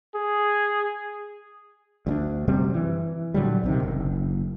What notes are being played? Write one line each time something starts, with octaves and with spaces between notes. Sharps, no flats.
G#4
D2 G3 D4
F#2 C3 G3 C4
E3
A#2 D3 F#3 G3
B1 C3 D#3
F#1